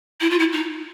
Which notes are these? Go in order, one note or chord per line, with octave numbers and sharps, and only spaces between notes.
E4
F4
E4
D#4